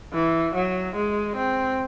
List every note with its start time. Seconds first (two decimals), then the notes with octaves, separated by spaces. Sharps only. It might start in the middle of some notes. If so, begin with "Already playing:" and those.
0.13 E3
0.55 F#3
0.96 G#3
1.36 C4